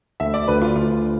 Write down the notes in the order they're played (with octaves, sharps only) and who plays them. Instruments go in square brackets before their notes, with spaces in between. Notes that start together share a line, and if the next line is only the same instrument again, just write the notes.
[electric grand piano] D2 [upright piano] E5
[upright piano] D5
[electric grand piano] D2 [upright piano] B4
[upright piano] F4
[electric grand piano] D2 [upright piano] F4